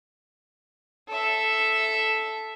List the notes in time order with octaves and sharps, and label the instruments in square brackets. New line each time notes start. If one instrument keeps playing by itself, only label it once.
[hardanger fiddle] A4 E5